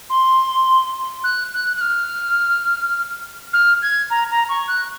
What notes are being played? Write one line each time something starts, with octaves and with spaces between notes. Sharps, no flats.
C6
F#6
F#6
F#6
F6
F6
G#6
A#5
A#5
C#6
F#6